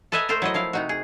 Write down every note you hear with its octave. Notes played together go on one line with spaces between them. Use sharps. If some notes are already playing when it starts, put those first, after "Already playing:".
A4 B4 D#5 E5 G#5 A#5
A3 A4 A#4 C5
F#3 E4 D#5
F3 E4 F5
C3 D#4 F#4
G#4